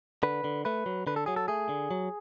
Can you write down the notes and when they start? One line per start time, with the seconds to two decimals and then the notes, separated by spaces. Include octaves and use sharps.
0.23 D3 B4
0.44 D3
0.65 A3 B4
0.86 F#3
1.07 D3 B4
1.16 A4
1.26 F#3 G#4
1.36 A4
1.48 A3 G#4
1.69 D3
1.91 F#3